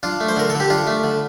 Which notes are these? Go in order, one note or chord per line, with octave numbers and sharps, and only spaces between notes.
D4 F4
A3
C5
D3 A#4
D3 A4
G4
D4 F4
A3
D3